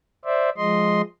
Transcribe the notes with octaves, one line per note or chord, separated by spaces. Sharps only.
C5 D5 E5
F3 G#3 D#5 C6